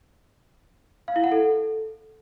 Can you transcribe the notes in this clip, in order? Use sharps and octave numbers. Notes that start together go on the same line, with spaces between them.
F5
E4
F#5
A4